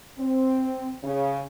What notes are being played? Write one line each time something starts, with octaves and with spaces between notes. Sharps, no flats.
C4
C#3